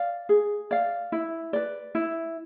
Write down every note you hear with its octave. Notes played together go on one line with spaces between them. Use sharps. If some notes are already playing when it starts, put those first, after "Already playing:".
Already playing: D5 F5
G#4
D5 F5
E4
B4 D5
E4